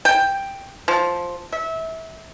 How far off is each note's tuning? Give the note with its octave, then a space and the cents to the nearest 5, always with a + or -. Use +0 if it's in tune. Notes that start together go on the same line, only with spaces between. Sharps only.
G5 +5
F3 +5
E5 -25